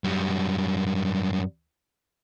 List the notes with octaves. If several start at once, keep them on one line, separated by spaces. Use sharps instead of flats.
F#2 G3